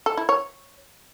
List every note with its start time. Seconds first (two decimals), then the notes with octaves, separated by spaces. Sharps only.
0.06 A4
0.17 E4
0.29 C#5